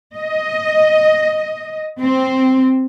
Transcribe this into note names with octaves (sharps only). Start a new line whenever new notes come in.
D#5
C4